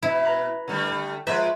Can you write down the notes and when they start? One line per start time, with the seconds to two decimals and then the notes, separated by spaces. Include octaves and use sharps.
0.03 B2 E4 E5
0.25 B4 A#5 B5
0.68 D3 G3 A3
1.27 F3 G#3 B4 E5 C6 G6